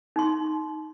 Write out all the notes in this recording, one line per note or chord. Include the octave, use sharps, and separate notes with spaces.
D#4 C6